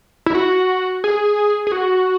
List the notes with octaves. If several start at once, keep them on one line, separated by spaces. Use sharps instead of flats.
E4
F#4
G#4
G#4
F#4